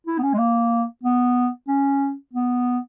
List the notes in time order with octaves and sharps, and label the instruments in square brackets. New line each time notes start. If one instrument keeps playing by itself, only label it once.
[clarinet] E4
B3
C#4
G#3
A#3
B3
C#4
B3